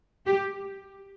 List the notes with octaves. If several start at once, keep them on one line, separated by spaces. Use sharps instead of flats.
G4